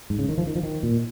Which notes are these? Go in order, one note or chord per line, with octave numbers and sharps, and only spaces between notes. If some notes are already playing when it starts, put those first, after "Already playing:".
G#2
C#3
D#3
F3
D#3
F3
D#3
A#2